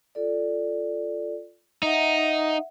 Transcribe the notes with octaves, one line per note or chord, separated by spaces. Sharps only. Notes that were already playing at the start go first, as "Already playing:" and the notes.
F4 A4 D5
D#4 E5 F#5